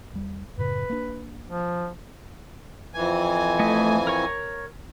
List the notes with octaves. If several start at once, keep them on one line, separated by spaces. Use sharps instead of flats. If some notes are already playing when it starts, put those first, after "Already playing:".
E2 G3
F#2 A2 C#3 B4
A#3 D4
F3
F2 E3 G#5
A3 D#5
A#4 C#5 C#6